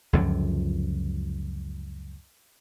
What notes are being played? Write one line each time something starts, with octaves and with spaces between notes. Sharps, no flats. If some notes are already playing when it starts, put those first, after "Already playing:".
C#2 F#2 D3 F3